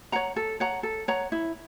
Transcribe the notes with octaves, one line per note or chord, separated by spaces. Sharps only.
C#5 F#5 A#5
A4
C#5 F#5 A#5
A4
C#5 F#5 A#5
E4